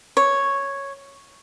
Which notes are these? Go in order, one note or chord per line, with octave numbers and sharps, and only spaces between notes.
C#5